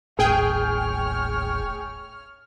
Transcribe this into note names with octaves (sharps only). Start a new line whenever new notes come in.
D#1 A1 A2 G#4 C#5 G5 F6